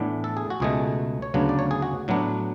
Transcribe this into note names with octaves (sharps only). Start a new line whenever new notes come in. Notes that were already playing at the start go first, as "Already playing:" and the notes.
Already playing: A2 E3 B3 D4
A4
G#4
F#4
C#2 B2 A3 G#4
C#5
D2 C#3 F#3 B3 D4 B4
D5
C#5
G#4
F#4
A2 F#3 B3 D4